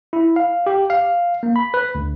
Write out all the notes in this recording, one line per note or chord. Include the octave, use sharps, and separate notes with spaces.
E4
F5
G4
F5
A#3
B5
B4
D2